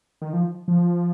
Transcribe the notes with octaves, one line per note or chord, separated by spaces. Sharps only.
D#3
F3
F3